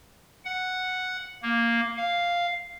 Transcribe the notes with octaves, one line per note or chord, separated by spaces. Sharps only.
F#5
A#3
F5